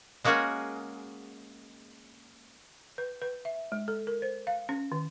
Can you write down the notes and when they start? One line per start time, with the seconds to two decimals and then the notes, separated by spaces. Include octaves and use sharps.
0.24 G#3 A#3 C#4 F#4 G#4
2.98 B4
3.22 B4
3.45 E5
3.72 G#3
3.88 A4
4.07 A#4
4.22 C5
4.47 F5
4.69 C#4
4.92 D#3